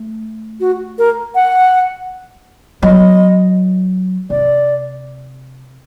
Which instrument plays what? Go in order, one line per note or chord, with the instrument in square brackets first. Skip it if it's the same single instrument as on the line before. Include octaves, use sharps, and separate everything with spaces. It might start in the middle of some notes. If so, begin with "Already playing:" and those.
Already playing: [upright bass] A3
[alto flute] F#4
A#4
F#5
[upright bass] F#3 [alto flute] D#5
[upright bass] C3 [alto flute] D5